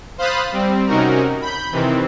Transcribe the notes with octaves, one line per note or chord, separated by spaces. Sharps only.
C5 F5 B5 D#6 F#6 A6
G3 C4
C3 C#4 D#4 F#4 A#4
B5 G6
C3 D#3 E3 C4